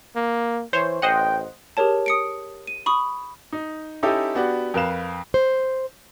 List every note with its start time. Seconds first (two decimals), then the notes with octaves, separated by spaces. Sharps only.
0.16 A#3
0.73 E3 C5 C#5
1.02 A1 C5 D#5 F#5 G5
1.77 G4 G#4 A#4 C#5 A5
2.06 D#6 C#7 D7
2.67 D#7
2.86 B5 C#6 D#6
3.53 D#4
4.03 C#4 D#4 E4 G4 A4 E5
4.35 B3 D4 F#4 G4
4.74 F2 A#4 B4 F5 E7
5.34 C5